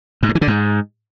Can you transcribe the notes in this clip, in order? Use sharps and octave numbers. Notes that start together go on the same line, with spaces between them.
G#2
G2
E3
D3
G#2